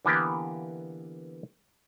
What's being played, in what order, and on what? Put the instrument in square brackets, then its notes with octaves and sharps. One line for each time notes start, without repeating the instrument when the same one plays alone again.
[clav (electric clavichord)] D3 E3 A#3 B3 G4